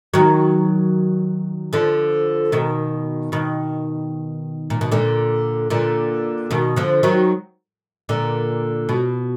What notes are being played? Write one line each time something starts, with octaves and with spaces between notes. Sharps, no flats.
D#3 F#3
D3 F3
B2 D#3
B2 D#3
A#2
B2
A#2 D3
A#2 D3
B2 D#3
D3 F3
D#3 F#3
A#2 D3
B2